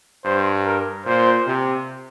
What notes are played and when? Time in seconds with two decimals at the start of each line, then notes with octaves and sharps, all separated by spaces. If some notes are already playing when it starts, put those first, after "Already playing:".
0.25 G2 C5
0.66 A#4
1.06 A#2 C5
1.47 C3